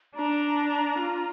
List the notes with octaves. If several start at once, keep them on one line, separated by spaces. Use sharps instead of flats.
D4 A#5
F4